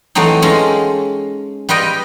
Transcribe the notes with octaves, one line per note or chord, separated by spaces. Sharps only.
E3 F#3 A3 C4 D#4
G#3 C#4 F4 A4
G3 F4 B4 D#5 G5